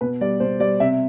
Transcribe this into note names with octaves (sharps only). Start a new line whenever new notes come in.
B2 B4
G3 D5
B2 C5
G3 D5
C3 E5